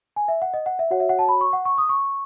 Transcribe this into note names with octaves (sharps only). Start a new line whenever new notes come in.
G#5
E5
F#5
D#5
F#5
E5
F#4 C#5 F#5
E5
F#5
A5
B5
C#6
F#5
C#6
D#6
C#6